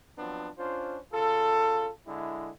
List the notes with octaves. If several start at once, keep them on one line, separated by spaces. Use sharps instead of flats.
F3 F#3 B3 C4 D4
C#4 D4 F4 C5
C#3 F4 A4
D3 G#3 E4